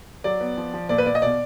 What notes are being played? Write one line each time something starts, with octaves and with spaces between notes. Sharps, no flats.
F#3 D5
B3
F3
F3
A#2 D5
B4
A#2 D5
D#5
B2 D5